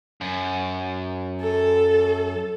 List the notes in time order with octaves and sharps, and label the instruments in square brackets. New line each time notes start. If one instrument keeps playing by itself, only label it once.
[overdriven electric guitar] F#2
[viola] A4